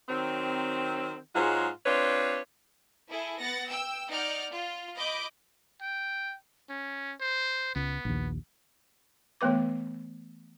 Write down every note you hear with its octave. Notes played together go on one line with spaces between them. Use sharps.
D#3 F#3 C4
G#2 F#3 G#3 F4 F#4
C4 D4 F4 B4 C#5
E4 G#4 A4
B3 F#5 A6 A#6
G5 E6
D#4 D5 F#5 F6 G6
F4
D#5 B5 D6 G6
G5
C#4
C5
C#2 B3
A#1 D#2
E3 A3 B3 B4 D6